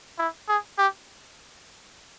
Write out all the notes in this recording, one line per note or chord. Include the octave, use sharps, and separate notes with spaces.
E4
G#4
G4